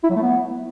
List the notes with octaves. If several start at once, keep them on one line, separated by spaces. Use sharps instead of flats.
E4
F#3
A3
B3